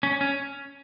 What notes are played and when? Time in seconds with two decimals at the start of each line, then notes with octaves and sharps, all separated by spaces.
0.03 C#4
0.21 C#4